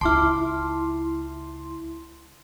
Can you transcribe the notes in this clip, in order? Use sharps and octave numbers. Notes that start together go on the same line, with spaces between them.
C#2 E4 A5 C6 D6 F6